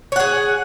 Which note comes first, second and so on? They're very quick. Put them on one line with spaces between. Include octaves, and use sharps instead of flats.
C#5 F#5 G#4